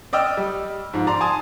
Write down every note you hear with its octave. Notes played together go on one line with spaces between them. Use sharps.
D5 D#5 G5 E6 F6
G3
G#2 F3
D5 A#5 C6
G#5 A5 C6 D#6